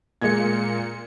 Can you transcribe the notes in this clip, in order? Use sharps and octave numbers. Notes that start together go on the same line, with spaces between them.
A#2 G#3 G#6 C#7